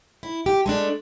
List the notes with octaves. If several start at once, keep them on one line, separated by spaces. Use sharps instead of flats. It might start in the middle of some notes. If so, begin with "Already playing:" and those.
E4
G4
G#3 A3 D4